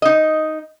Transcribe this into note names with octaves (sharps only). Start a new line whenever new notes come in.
D#4 D#5